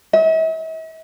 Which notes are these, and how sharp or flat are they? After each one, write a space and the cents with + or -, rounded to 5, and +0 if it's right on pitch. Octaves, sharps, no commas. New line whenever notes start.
E5 -45